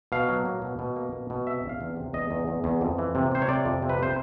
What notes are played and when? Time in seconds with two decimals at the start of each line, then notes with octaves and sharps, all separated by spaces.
0.12 B2 F5
0.29 F#3
0.45 A#3
0.62 B2
0.79 B2
0.96 A#3
1.13 B2
1.30 B2
1.47 C3 E5
1.64 E2
1.69 F5
1.81 E2
1.97 C3
2.13 E2 D#5
2.31 E2
2.48 E2
2.64 E2
2.81 F2
2.98 E3
3.15 C3
3.32 C3 C5
3.42 C#5
3.48 C3 D5
3.65 F2
3.82 C3
3.89 B4
3.99 C3 C5